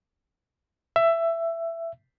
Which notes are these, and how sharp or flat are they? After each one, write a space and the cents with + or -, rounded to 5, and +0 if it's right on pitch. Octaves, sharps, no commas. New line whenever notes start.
E5 +15